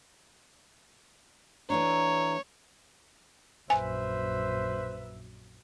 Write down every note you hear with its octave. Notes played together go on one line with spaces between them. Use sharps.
E3 A3 D4 C#5 A#5
A#1 F#2 B4 C5 E5 G#5